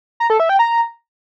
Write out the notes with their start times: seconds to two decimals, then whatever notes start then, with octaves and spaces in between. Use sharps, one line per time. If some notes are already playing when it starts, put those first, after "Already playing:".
0.20 A#5
0.30 A4
0.40 E5
0.49 G5
0.59 A#5